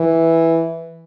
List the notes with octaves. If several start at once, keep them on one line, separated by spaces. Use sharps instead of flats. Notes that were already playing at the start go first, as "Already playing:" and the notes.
Already playing: E3